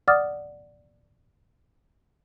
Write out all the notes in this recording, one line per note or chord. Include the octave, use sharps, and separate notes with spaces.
D5 F#5 D6 D#6 F6 A6